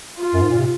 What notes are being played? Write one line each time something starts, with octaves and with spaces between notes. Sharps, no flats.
F4
F#2
G#2
A#2
C3